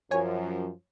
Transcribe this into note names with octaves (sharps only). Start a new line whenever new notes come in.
F#2 F3 C#5 G#5